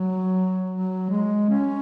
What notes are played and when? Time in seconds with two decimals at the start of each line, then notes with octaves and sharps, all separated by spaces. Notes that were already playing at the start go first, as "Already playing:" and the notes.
Already playing: F#3
0.70 F#3
1.10 G#3
1.50 C#4